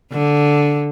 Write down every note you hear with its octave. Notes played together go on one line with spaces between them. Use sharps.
D3